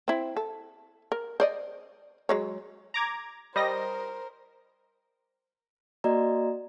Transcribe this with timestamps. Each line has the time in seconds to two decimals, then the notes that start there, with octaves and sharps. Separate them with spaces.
0.08 C4 E4
0.37 A4
1.12 A#4
1.40 C5 D5 D#5
2.29 F#3 G#3 C#5
2.94 A#5 D6 G#6
3.56 G3 A#4 C5 D#5 A#6
6.04 A#3 F#4 D5 D#5 A#5